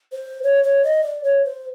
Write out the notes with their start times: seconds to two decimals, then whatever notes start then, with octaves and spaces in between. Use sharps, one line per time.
0.12 C5
0.43 C#5
0.64 C#5
0.84 D#5
1.03 D5
1.24 C#5
1.45 C5